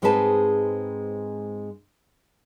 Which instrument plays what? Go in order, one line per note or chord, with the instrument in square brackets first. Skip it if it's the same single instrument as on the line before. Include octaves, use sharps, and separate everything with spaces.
[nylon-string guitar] G#2 G#3 C4 D#4 B4 A5